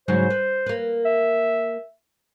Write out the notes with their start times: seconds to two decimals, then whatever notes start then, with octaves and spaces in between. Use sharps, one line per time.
0.08 G#2 C#3 F#3 C5
0.30 B4
0.66 A#3 B4
1.05 E5